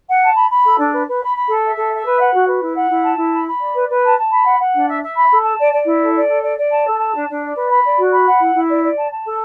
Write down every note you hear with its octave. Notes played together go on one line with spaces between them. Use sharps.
F#5
A5
B5
B5
A4
D4
B4
B4
B5
B5
A4
E5
A4
E5
B4
F#5
F#4
B4
E4
F#5
E4
A5
E4
B5
B5
D5
B4
B4
A5
A5
B5
F#5
F#5
D4
E5
E5
B5
A4
A5
D5
D5
E4
A4
D5
A4
D5
D5
A5
A4
A5
D4
D4
D5
B4
B5
D5
F#4
B5
F#5
E4
E4
D5
D5
A5
A5
A4